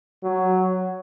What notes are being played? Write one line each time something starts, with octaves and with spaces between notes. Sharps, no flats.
F#3